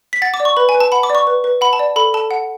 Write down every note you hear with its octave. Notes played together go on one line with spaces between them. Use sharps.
B6
F#5 A6
D6
D5
C#6
B4 B5
G#5
B4
A5
F#5 B5
D6
D5
C#6
B4
B4
F#5 B5
A5
D5
A4 B5
A4 A5
F#5